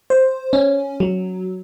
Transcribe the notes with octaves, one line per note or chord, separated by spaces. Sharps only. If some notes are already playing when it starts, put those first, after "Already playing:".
C5
C#4
F#3